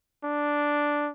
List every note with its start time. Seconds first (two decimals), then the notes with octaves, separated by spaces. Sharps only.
0.24 D4